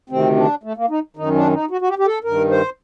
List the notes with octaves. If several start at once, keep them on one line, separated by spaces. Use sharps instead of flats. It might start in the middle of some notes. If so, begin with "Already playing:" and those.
D2 C3 D#3 C4
D4
A3
A#3
D#4
F#2 D#3 D#4
D4
D#4
F#4
F#4
G4
G4
A4
G2 D#3 A#4
C5